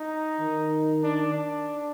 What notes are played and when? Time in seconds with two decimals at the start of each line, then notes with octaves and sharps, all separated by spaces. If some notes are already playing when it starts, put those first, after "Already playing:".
Already playing: D#4
0.40 D#3
1.03 D4
1.34 D4